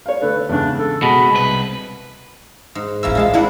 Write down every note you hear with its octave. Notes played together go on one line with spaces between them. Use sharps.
C#5 F5
D3 A3 B4
E2 G#2 C#3 D4
A4
B2 G#3 B5
C2 B4
G#2
A1 E3 A#3 C#4 E6
A#1 G#3 E4 F5 A5
G3 A#3 C4 D4 E4 F#5